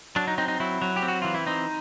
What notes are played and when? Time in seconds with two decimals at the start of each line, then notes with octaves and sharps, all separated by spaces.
0.16 F#3 D4
0.28 D#4
0.38 C4 D#4
0.48 D#4
0.60 F#3 E4
0.82 F#3
0.96 G4
1.03 C4
1.08 F#4
1.22 E3 F4
1.34 E4
1.46 C4 D#4